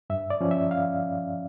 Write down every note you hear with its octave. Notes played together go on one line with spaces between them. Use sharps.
G2 E5
D5
F3 C#4
E5
F5